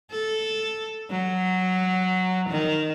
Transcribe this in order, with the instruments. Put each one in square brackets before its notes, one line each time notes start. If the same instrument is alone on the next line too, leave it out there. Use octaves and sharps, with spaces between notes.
[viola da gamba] A4
F#3
D#3